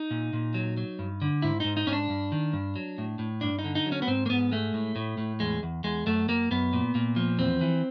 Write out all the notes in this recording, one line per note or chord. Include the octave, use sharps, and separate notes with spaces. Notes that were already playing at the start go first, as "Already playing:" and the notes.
Already playing: D#4
A#2
A#2
F#3
F#3
G2
D3
G#2 E4
G#2 D#4
D#4
G#2 C#4
D4
G2
D#3
G2
F#3
A2
A2
G2 D4
D#4
D3
D#4
F#3
C#4
B3
G#2 C4
A#3
G#2 B3
G#3 A3
A2
A2
A2
E2 G#3
E2
E2 G#3
F#2 A3
F#2 A#3
F#2 B3
A#2
A#2
F3
E2 C4
E3